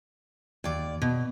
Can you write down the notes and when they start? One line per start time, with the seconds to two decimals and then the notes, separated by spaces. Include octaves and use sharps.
0.64 D#2 D5
1.02 B2